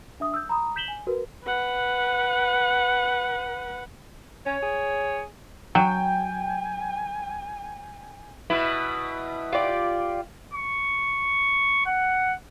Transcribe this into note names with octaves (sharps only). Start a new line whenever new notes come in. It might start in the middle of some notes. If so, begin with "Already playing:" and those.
D4 E5 D#6
E6 G6
A#5 B5 D#6
G6 B6 E7 F#7 G7
G#5
F#4 A#4 B4
B4 F#5
C#4 C#5
G#4
F#3 G5 G#5
B2 E4 B4
F4 G4 D5
C#6
F#5